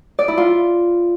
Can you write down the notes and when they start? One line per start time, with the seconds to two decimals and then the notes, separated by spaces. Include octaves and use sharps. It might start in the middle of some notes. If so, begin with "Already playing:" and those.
0.19 D5
0.28 E4
0.38 F4